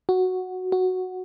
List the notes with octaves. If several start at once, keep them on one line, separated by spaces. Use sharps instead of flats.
F#4
F#4